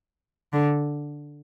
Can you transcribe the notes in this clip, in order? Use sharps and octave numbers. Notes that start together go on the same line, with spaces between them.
D3